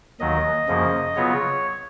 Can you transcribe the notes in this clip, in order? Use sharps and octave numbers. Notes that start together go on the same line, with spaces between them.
D#2 D#3 F#3 D#5
F#2 C#3 F3 A#3
C#3 F#3 B3 F4 C#5